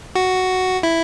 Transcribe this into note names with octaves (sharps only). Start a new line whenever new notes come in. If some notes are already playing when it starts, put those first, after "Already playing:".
F#4
E4